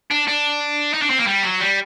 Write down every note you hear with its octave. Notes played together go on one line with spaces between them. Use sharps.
D4
D4
D#4
D4
C4
A#3
G3
F#3
G3